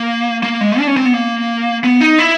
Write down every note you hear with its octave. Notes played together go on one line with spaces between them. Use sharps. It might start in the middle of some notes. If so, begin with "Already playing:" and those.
Already playing: A#3
A#3
G#3
D4
C#4
C4
B3
A#3
B3
D#4
E4